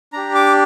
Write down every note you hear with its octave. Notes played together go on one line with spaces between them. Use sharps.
D4 G4 A#5
D6